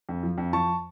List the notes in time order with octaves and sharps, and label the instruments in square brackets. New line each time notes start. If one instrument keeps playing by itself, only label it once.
[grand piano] F2
F3
F2
F3 A5 C#6